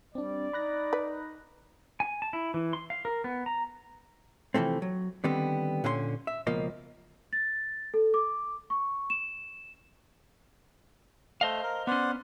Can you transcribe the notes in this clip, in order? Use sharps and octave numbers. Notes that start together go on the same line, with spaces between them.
G3 C4 D4 D5
D#4 B5 F#6 A#6
B4
G#5
A5
E4
E3
C6
F5
A#4
B3
A#5
C3 E3 F3 A3 C4
F#3
D3 D#3 G3 B3 C4
A#2 D3 C#4 F5 C6
E5
C#2 B2 F3 A#3 D#5
A6
A4
D6
C#6
E7
A3 C5 D#5 F5
A#4
B3 C#4 C5 D5 F#5